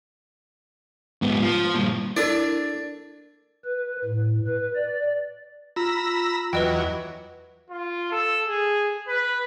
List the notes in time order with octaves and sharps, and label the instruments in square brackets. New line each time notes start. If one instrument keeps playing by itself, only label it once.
[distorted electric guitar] G#2 B3
F3
G2 A#2
[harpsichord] D4 A4 D5 [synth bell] E4 A#4
[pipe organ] B4
A2
B4
D5
[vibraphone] F4 [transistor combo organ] A#5 B5 E6
[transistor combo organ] E2 F#3 [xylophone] B4 D#5 G5
[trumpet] F4
A4
G#4
B4